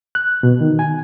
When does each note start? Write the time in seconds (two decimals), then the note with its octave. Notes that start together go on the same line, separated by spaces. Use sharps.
0.15 F#6
0.43 B2
0.61 D#3
0.79 G#5